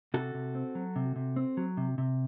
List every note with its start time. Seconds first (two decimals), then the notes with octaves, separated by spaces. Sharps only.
0.14 C3 F#4 A4
0.34 C3
0.55 C4
0.75 F#3
0.96 C3
1.16 C3
1.36 C4
1.57 F#3
1.77 C3
1.98 C3